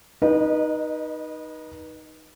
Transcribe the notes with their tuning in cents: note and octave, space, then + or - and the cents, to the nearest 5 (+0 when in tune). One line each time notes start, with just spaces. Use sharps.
D#4 +0 B4 -30 D#5 -30